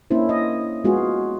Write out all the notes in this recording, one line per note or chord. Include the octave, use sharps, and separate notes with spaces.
A#3 C#4 D4 E4 C5
D#5
G#3 B3 F4 F#4 G#4